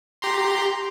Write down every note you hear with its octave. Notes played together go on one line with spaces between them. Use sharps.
G4 A#5 C6